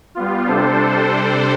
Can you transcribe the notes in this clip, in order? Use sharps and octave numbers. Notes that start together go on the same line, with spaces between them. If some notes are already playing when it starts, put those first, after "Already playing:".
G3 B3 F4
C3 G3 D4 A4 C5